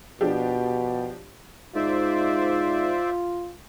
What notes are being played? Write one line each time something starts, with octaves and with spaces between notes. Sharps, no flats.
B2 F3 D4 G4
G#2 F4 C5 D5 E5